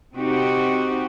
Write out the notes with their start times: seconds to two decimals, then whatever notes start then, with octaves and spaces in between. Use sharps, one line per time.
0.13 C3 C4 D#4 F#4 G4